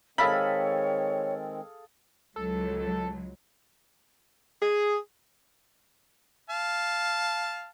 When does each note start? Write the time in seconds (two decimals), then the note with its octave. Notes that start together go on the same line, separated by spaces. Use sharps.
0.18 D#3 G#3 C4 G#4 A4 C#5 F5 B5
2.36 C#2 F#3 A4
4.61 G#4
6.50 F5 A5